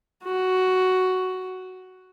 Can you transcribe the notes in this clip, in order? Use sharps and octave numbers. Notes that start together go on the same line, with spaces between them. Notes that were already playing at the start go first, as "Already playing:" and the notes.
F#4